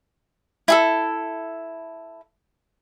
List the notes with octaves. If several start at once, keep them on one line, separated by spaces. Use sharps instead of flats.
E4 G#4 A4